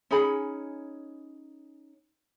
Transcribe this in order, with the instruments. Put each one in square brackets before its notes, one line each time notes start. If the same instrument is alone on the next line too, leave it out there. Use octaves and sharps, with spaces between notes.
[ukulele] C#4 D#4 G#4 B5